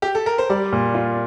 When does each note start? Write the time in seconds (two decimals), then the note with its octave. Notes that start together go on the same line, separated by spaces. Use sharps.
0.02 G4
0.15 A4
0.26 A#4
0.38 C5
0.50 G3 D5
0.73 A#2
0.95 F4